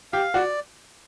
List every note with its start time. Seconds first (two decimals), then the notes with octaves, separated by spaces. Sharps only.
0.13 G4 F5
0.34 F#4 D5